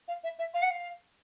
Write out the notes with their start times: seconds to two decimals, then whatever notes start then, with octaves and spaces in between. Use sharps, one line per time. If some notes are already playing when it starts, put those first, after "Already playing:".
0.08 F5
0.24 E5
0.39 E5
0.54 F5
0.62 F#5
0.71 F5